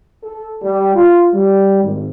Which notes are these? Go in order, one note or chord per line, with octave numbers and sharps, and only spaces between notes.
A4
G3
F4
G3
G#1